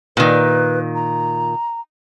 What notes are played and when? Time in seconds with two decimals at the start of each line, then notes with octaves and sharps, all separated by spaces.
0.17 A#2 D#3 B4
0.95 A#5